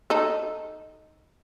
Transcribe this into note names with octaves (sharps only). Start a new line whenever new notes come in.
D#4 A4